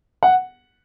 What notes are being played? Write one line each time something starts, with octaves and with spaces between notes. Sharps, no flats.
F#5